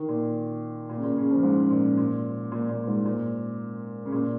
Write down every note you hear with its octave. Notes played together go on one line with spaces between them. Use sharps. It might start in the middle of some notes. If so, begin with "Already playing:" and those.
Already playing: D#3
A#2
A#2
C#3
A#2
C#3
F3
G#2
A#2
A#2
A#2
A#2
G#2
A#2
C#3
A#2